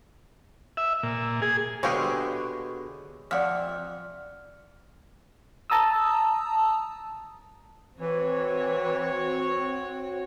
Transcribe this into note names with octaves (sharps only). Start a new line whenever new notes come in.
E5
A#2
G#4
B2 D3 G#3 G4 G#4 C#5 F5
F2 D5 E5 F#5 F6
A5 A#5 D#6 E6
E3 C4 F#4 C#5